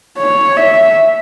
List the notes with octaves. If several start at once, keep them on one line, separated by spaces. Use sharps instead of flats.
C#5
E5